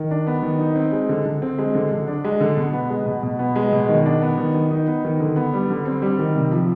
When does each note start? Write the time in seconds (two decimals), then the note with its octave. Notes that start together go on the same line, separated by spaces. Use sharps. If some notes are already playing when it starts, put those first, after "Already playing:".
Already playing: D#3
0.11 D4
0.27 B3
0.43 D#3
0.59 D#4
0.76 C4
0.92 G#3
1.09 D3
1.25 D3
1.42 C4
1.58 G#3
1.75 D3
1.91 D3
2.07 D4
2.24 G#3
2.40 D3
2.57 B2
2.73 B3
2.90 G#3
3.06 B2
3.23 B2
3.39 B3
3.56 G#3
3.72 B2
3.89 D#3
4.05 D4
4.22 B3
4.38 D#3
4.54 D#3
4.70 D#4
4.87 B3
5.04 D#3
5.20 D3
5.36 B3
5.53 G3
5.70 D3
5.86 C4
6.02 G3
6.19 D#3
6.35 C3
6.51 F3